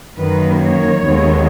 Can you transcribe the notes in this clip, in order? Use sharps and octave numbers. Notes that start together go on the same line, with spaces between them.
F#2 D#3 A#3 B4
C#5
D#2 D#3 G#3 B3